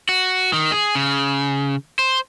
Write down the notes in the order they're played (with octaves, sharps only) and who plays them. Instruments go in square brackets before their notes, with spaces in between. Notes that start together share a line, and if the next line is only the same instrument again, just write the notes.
[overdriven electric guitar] F#4
D#3
G#4
C#3
C5